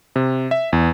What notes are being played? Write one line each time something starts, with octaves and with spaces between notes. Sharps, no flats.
C3
E5
E2